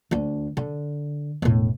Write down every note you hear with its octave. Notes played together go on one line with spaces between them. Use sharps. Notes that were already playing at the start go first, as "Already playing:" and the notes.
D2 D4
D3
E1 A2